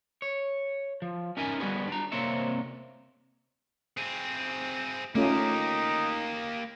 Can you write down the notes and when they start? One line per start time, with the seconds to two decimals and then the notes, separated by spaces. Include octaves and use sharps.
0.22 C#5
1.02 F3
1.37 C#4 D#4 A#4 E5 G#5
1.60 G3 B3 F#4 G#4 B4
1.88 D4 A#5
2.12 C3 A#3 C4 D4 C#5 E5
3.97 C4 G#4
5.15 A3 A#3 C#4 D#4 F4 G4